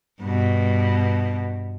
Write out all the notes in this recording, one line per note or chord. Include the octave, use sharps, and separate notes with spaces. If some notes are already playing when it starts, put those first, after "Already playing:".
G2 B2